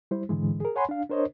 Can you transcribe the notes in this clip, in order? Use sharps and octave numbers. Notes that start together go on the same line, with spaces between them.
G3 E4 C5
G#2 D3 E3 G#3
G#4 A#4
C#5 F#5 G#5 B5 C6
D4 F5
D4 A#4 C5 C#5 D#5